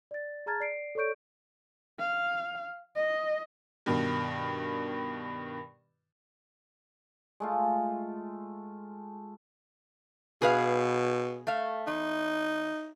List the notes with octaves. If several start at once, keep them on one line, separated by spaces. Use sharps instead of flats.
D5 A6
G#4 A5 A#5 F6 G#6 A6
D5 C7 D7
A4 C#5 D5 C#6 G6 D7
F5
D#5
G2 B2 D#3
G#3 A3 F4
B2 G#4 B4 F5
A3 F5
E2 D#4